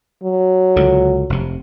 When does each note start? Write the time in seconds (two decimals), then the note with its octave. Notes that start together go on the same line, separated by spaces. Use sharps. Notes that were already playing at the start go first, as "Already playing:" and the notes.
0.24 F#3
0.76 C#2 D3
1.30 F1 C3